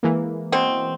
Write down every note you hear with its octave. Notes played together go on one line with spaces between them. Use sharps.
E3 G#3 A#3
B2 C4